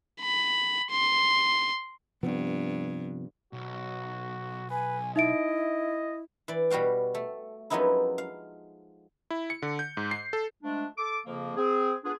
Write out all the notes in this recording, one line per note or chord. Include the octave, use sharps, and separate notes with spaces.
B5
C6
G2 C3 F3 B3
B1 F#4
B4 G#5
D#4 E4 D#5 E5 D7
E3 D5
B2 G3 F#4 F5 G5
A3
F#2 F3 G#3 B3 D#4 E4
F5
E4
C#7
D3
G6
G#2
C7
A4
F3 G#3 A3 D4
A4 D6
F2 C#3 F3 A#3
C4 G#4
B3 D4 F4 G#4